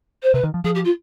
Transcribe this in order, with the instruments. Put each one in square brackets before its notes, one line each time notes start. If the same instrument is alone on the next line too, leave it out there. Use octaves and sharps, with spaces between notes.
[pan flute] C5
[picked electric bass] C3 [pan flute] B4
[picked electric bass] D#3
F3
[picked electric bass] F3 [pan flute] G#4
[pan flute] G4
F4